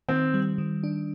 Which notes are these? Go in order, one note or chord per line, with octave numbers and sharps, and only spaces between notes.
D#3 C4
G3
D#3
D4